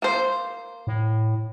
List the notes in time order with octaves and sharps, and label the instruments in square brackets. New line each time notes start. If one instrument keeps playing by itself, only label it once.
[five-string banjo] A#3 C5
[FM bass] A2